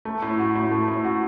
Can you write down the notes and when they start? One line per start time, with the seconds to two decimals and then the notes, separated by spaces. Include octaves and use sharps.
0.05 A3
0.22 A2
0.39 F#4
0.55 A2
0.71 A3
0.88 A2
1.04 F#4